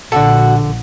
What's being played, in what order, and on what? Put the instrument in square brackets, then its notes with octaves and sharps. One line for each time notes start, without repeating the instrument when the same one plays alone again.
[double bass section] A#1 [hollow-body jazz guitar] D3 A4 [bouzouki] F#4